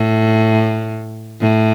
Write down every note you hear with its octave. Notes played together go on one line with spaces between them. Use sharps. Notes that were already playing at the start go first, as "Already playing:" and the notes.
Already playing: A2
A2